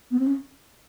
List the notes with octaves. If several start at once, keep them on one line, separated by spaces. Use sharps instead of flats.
B3
C4
C#4